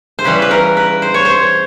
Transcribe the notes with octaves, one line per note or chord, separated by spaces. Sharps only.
C5
C#3 E3 G3 B4
B4
A#4
B4
C5
C#5
C5